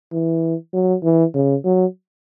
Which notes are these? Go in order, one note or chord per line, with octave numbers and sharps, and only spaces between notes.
E3
F#3
E3
C#3
F#3